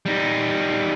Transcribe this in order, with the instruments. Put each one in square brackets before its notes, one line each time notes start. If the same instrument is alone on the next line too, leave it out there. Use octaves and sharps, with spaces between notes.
[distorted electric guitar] G3 D#4